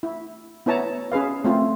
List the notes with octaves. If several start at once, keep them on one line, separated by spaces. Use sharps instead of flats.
E4
B3 E4 C#5 A5 A#5
C#4 G#4 B4 F5
A3 C4 F4